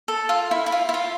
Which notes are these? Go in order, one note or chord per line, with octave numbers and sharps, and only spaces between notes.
A4
F4
E4
E4
F4
E4
F4